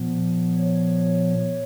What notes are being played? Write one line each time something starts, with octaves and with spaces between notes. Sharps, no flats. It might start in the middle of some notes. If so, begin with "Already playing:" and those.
Already playing: A#2 F3 B3
C#5